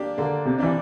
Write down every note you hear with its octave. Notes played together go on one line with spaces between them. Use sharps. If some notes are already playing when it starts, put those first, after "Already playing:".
Already playing: A#3 D4 G4 D5
D3 A#3
C3
E3 D4 G4 D5